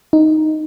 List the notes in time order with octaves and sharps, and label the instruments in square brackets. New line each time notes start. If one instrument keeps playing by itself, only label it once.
[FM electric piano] D#4